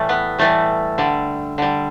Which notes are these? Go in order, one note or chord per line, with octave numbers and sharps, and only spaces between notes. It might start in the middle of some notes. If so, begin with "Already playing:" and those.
Already playing: A2 E3 G3 A3
B3
A2 E3 G3 A3
D3 G3
D3 G3